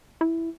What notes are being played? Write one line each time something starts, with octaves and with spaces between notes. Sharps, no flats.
E4